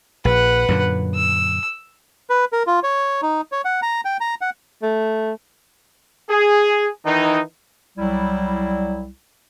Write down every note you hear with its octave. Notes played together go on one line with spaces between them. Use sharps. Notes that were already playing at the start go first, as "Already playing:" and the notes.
A#1 B4 F#5
F#2 A#2 D3
E6
B4
A#4
F4
C#5
D#4
C#5
F#5
A#5
G5
A#5
F#5
A3
G#4
D#3 E3 D#4
C2 F#3 G3 E4